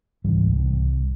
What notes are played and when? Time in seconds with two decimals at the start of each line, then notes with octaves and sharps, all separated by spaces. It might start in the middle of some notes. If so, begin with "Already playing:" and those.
0.24 C#2 G#2 E3 G3
0.52 C2